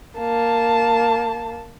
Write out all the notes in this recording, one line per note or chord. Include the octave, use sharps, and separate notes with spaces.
A#3 A5